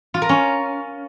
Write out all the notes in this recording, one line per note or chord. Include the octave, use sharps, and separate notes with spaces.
F4
A#4
C#4